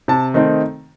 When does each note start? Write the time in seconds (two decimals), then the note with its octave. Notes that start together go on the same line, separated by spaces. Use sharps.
0.08 C3 A5
0.34 D#3 A3 C4 D#4